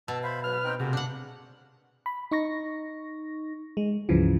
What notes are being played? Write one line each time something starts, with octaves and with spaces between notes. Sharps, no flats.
B2 A5 E6
C5 E5 F5 B5
G#2 F#3 B4 F6
C4 D#4 G5
C3 A3 A#3 F#4 G#4
D4 F#5
B5
D#4 C#6 A#6
G#3
C#2 G2 C#3 E3 F3